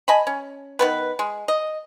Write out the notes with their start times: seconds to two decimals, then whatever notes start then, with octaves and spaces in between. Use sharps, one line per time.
0.08 D#5 G#5 A5 B5
0.27 C#4
0.79 D#3 B3 B4
1.19 G#3
1.48 D#5